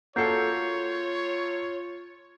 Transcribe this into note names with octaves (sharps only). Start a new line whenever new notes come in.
A#3 F4 F#4 A4 C#5 G6 C7